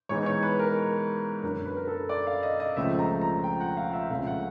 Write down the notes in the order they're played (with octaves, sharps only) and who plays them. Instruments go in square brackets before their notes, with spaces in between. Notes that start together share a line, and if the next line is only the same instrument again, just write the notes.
[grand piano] G#2 E3 G#3 B3 D#4 C#5
C#5
B4
A#4
F#2 D3 F#3 A#4
B4
A#4
A4
D5
F5
D#5
D#5
C#2 C#3 F3 A3 C4 E5
A#5
A#5
G5
F#5
F5
E5
C#2 C3 F3 A3 C#4 F5
F#5